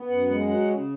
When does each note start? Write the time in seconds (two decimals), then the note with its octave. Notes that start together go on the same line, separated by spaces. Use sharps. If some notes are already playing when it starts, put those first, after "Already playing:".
Already playing: B3
0.09 F#2 F#5
0.29 G#3 F#5
0.48 F#3 F#5
0.68 C#3